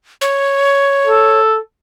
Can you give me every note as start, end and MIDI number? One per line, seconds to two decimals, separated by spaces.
0.21 1.40 73
1.07 1.57 69